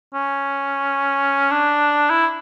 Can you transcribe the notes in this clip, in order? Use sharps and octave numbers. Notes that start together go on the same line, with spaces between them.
C#4
D4
E4